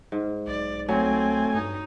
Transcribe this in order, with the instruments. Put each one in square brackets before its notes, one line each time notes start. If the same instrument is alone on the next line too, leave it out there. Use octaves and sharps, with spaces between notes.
[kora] G#2
[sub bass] B1 [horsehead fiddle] D5
[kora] F#3 [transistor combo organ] A3 G#5 [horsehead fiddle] C4
[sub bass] G2 [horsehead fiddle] D#4